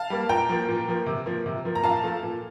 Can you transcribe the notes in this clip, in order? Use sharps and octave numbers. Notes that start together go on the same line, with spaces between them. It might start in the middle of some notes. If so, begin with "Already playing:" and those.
Already playing: F5 A5
G3 A#3
A#2 G5 A#5
F3 A#3
A#2
F3 A#3
C3
F3 A#3
C3
F3 A#3
A#5
A#2 F5 A5
F3 A3
A#2